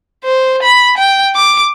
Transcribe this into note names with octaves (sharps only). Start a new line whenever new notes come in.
C5
B5
G5
D6